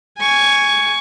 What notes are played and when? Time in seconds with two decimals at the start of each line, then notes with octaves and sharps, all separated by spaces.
0.19 G#5 C#6